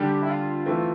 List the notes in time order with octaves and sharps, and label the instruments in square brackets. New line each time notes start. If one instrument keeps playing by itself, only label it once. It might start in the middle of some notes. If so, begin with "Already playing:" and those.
Already playing: [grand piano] D3 G3 D4 [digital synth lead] G4
[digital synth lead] E4
F4
[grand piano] E3 A3 C4